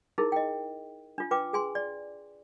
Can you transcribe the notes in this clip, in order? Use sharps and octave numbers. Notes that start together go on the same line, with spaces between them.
D#4 E4 G#4 A#4
D#5 G5
D4 F4
F4 B4 G5 D6
G#4 G#5 C6
D5